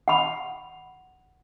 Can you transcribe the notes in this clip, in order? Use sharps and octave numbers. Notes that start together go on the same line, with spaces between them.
F#5 B5